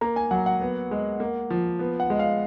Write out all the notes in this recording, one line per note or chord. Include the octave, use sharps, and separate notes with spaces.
A#3 A#5
G#5
F#3 F#5
F#5
B3
G#3
A#3
F3
B3
F#5
G#3
F5